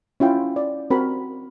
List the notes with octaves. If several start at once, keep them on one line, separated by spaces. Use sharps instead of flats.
C#4 E4 F4 G5
D5
C4 F#4 A#4 B5